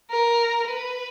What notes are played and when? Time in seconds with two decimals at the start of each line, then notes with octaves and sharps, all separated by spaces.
0.11 A#4
0.68 B4